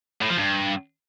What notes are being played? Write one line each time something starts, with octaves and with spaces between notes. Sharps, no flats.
A2
F3
G2